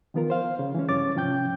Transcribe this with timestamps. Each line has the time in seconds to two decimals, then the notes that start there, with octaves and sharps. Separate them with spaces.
0.14 D#3 F3 B3 F4 A#4
0.30 C5 F5
0.59 C#3
0.74 E3 F3 G#3 C#4
0.89 G2 C#4 C#5 D6 A6
1.15 G#2 C3 F3 C#4 G5 G6